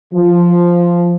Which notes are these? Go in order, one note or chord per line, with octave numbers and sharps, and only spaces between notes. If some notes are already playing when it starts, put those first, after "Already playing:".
F3